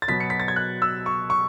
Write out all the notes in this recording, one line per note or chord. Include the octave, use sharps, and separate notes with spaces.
A6
B2 F#3 B3 B6
C#7
B6
A6
G#6
F#6
E6
C#6
C#6